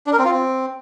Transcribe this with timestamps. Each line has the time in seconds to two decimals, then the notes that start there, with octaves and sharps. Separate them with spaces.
0.07 D4
0.13 A#4
0.19 C4
0.25 F4
0.31 C4